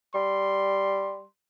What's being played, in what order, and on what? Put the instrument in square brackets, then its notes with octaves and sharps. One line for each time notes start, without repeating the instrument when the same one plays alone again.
[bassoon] G3 [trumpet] C6